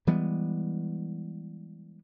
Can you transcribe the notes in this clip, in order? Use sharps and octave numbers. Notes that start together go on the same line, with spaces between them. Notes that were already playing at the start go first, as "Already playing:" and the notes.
E3 G3 G#3 B3